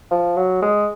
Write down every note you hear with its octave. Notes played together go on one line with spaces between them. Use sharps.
F3
F#3
G#3